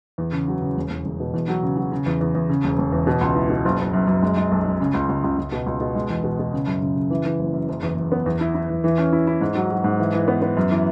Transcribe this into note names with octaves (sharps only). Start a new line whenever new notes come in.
E2
C#3
F#3
C#3
E1
E1
E1
B2
E2
F#3
C#3
F#3
C#3
E2
E2
E2
C#3
E1
E1
E2
B2
C#2
E4
B2
F#1
F#1
F#2
F#2
G#3
G#3
B1
G#3
C#3
C#2
C#2
C#2
C#2
B2
C#2
B2
G#3
E2
B2
B2
C#3
F#2
C#3
C#3
E3
E3
F#1
F#2
F#1
E2
E2
B3
E2
E4
E4
E2
E3
C#4
E4
E4
G#2
F#3
F#3
G#2
E3
E3
B3
B3
F#2
E3